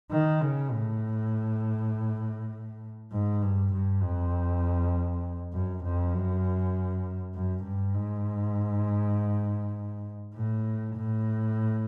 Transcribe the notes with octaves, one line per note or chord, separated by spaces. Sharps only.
D#3
C#3
A2
G#2
G2
G2
F2
F#2
F2
F#2
F#2
G2
G#2
A2
A2